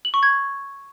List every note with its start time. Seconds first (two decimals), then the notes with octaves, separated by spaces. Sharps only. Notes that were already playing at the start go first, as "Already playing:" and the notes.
0.05 F#7
0.14 C#6
0.23 G#6